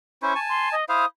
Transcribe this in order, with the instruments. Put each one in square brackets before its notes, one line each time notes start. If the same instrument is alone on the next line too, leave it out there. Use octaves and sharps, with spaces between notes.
[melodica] C#4 E4 C5 [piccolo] C#6
[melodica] G#5 A5
[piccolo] C6
D#5
[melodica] E4 C5 F5 [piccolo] D#6